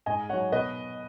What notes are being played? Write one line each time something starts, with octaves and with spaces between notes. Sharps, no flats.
G#2 D#5 G#5
F#3 D#4 C#5 F#5
B2 B4 D#5